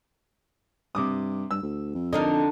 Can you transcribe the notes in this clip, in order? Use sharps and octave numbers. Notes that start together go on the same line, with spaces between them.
G2 C3 D6 D#6
G2 E6
D2
F2
D3 D4 D#4 A#4 D#5